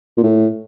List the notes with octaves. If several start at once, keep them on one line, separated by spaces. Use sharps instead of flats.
A#2
A2